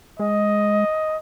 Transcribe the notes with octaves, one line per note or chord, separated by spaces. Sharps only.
G#3 D#5